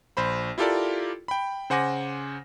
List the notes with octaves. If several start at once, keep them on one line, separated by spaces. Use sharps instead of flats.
A#1 C5 B5
E4 F4 G4 A4 A#4 D5
G5 B5
C#3 C5 F#5 G#5 D6 A#6